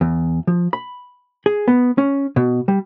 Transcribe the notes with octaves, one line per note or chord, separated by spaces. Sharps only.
E2
F3
B5
G#4
B3
C#4
B2
G3